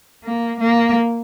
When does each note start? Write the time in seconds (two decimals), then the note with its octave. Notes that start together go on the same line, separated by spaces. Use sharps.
0.25 A#3
0.60 A#3